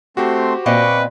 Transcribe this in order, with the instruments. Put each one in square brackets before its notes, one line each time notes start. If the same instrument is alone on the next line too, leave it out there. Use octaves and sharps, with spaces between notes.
[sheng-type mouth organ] A3 C4 C6 [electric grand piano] F#4 G4 C5
[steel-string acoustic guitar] A#2 C4 D#5 [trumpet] B4 [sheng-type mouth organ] C#6 D6